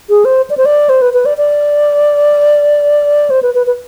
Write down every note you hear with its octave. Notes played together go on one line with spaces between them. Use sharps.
G#4
C5
D5
C5
D5
C5
B4
B4
D5
D5
C5
B4
B4
B4